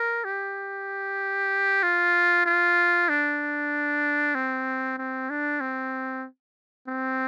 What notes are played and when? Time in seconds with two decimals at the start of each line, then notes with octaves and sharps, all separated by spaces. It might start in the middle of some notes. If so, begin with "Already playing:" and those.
Already playing: A#4
0.24 G4
1.83 F4
2.46 F4
3.09 D4
4.35 C4
4.98 C4
5.30 D4
5.61 C4
6.88 C4